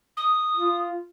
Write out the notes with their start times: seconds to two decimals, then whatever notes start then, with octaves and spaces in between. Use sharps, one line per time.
0.17 D#6
0.57 F4